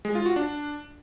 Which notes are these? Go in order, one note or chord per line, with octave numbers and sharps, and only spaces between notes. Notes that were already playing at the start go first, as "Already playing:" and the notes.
G#3
F4
F#4
D4